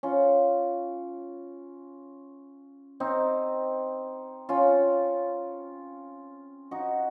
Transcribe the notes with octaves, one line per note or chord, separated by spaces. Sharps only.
C#4 F4
C4 D#4
C#4 F4
D#4 F#4